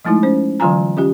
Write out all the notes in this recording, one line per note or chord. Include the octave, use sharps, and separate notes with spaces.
F3 G#3 A3 D#4 E4
C#4 C5
D3 E3 F#3 F4 G#5 A#5
C#4 F4 G4